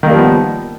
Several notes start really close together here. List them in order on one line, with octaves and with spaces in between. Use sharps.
D#3 A#3 G3 F3 B3